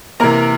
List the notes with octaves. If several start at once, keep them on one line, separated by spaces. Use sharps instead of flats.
C3 E3 A#3 A#4 A#5